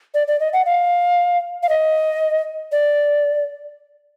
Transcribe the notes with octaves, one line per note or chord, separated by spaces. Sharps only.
D5
D5
D#5
F#5
F5
F5
D#5
D5